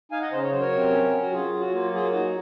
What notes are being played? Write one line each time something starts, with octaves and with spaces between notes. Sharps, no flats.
D#4 F5 G#5
D#5 F#5
C#3 C5 D#5
C#5
F#3 C5
A#4 C#5
C3
C#4
F#3
F#4
F#3 F4 G#4
F#3
F#4
A#3 F4
F#3 F4 G#4
D#4 F#4